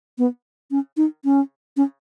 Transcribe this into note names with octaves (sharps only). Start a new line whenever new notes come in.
B3
C#4
D#4
C#4
C#4